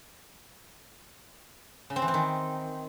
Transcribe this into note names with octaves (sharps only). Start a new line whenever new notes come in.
C#3
C4
E3
C4
D#3